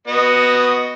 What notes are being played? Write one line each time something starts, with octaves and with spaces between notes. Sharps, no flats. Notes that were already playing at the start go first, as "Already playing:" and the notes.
B3 F#4 D#5